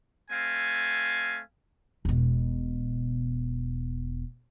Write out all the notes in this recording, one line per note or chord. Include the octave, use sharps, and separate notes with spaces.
A3 C4 F5 G#5
E1 B2